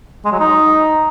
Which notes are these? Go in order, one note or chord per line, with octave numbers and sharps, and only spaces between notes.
G#3
F#3
D#4